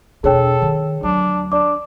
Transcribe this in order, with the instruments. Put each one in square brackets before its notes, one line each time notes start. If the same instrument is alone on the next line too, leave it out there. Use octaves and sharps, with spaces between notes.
[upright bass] E1 D4 [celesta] G#4 C#5 G5 [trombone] A4
[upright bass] D#3
[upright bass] D2 F#3 [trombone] D4
[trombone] D4 [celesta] D5 D6